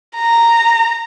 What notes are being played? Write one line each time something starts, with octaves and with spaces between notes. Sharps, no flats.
A#5